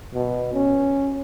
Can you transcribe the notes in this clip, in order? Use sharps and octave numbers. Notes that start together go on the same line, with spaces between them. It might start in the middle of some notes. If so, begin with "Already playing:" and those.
B2
C#4